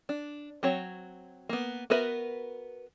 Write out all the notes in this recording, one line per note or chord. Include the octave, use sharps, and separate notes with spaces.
D4
F#3 C4 F#4 C#5
A#3 B3
B3 F#4 A#4 B4 E5